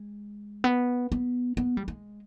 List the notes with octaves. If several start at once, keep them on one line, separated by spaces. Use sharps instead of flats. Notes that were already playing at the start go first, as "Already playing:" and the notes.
Already playing: G#3
B3
B3
B3
G3
G#3